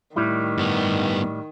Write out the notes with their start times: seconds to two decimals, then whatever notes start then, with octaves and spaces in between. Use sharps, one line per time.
0.16 A2 D#3 G3 E4
0.58 G2 B3